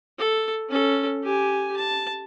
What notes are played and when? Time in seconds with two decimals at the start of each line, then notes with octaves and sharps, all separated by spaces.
0.19 A4
0.69 C#4 A4
1.23 G4 G#5
1.77 A5